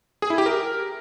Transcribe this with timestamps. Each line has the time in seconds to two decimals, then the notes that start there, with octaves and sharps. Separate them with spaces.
0.22 G#4
0.30 E4
0.38 G4
0.46 A#4